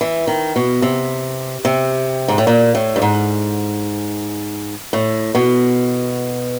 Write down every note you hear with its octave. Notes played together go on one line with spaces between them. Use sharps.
E3
D#3
B2
C3
C3
G#2
A2
A#2
A2
G2
G#2
A2
B2